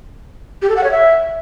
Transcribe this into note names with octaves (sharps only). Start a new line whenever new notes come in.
G4
A4
F#5
C#5
E5